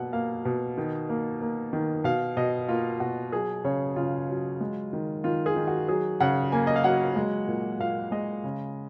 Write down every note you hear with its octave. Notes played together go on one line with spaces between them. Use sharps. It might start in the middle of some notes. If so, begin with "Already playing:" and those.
Already playing: B2 A#3 F#5
A#3 F5
B2
D#3
A#3
A#3
D#3
B2 F5
B2 D#5
A#3 F4
B2 F#4
F#3 G#4
C#3 C#5
C#3 F4
F#3
G#3
D#3
D#3 F4
G#4
D#3
F#4
F#3 G#4
C#3 F#5
A#3 G#5
D#5
F5
F#3 F#5
G#3
A#2
A#2 F5
G#3 D#5
C#3